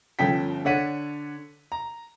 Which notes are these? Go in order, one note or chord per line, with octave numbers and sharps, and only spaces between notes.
G1 F3 C#4 A4 G5 B6
D3 D4 C#5 F#5 B6 D#7
A#5